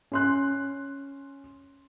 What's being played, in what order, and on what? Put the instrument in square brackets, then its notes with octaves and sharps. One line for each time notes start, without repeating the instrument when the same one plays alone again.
[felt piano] C#4 C6 F#6